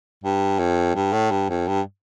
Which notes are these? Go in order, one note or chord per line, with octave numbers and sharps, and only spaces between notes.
G2
F2
G2
A2
G2
F2
G2